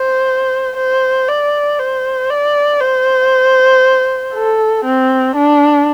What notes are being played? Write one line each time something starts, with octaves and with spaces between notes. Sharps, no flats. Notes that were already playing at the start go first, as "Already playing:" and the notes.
Already playing: C5
C5
D5
C5
D5
C5
A4
C4
D4